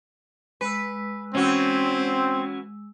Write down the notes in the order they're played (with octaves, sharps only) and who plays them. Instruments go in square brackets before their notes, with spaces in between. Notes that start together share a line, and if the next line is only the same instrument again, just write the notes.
[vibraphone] G#3 E6 [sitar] B4
[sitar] E3 F#4 [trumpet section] C4 [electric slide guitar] C#4